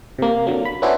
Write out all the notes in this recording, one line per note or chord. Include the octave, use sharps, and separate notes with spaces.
C3 A#3
D3 F#3 A#3
B5
B3 C#4 D4 E4 F#4 C5